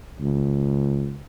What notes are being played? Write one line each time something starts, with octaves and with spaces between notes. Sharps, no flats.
C#2